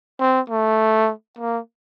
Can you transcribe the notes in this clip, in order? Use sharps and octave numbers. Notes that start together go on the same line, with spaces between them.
C4
A3
A#3